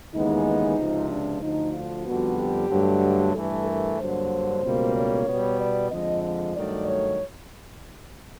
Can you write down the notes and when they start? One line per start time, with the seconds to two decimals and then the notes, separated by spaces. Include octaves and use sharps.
0.13 D#2 C#3 E3 G#3 B3 D#4
0.77 C#2 C3 F3
1.09 D4
1.42 D2 D3 F3 D#4
1.74 F4
2.05 F2 D3 G3 B3 F#4
2.38 G4
2.70 G2 D3 F#3 A3
3.34 G2 E3 A3 A4
3.67 A#4
3.98 G2 D3 F#3 A#3 C5
4.63 C#2 B2 G3 A#3
4.95 C#5
5.27 B2 G3 B3
5.59 D5
5.91 F2 D3 F3 G#3 D#5
6.23 D#5
6.55 G2 D#3 F#3 A3 D5
6.88 C#5